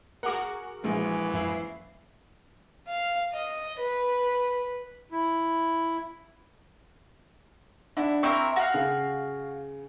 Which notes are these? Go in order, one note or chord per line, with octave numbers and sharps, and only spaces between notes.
F#4 G#4 A#4 F#5 D6
A#1 E3 G#3
F#2 E4 C7
F5
D#5
B4
E4
D4 E4 F#5
C4 E4 A#4 C#6
F#4 F5
C#3